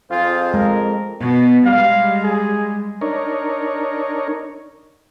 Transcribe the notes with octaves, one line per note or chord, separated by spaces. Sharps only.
F2 F4 G#4 C5 F5
G#3 A#4
B2
G3 G#3 F5
G#4
D4 D#4 A#4 C#5